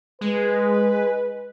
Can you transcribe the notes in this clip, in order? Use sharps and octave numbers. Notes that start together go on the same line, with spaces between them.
G#3 B4